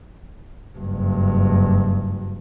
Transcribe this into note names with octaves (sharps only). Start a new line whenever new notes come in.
F#1 G2